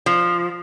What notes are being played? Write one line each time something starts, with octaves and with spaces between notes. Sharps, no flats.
F3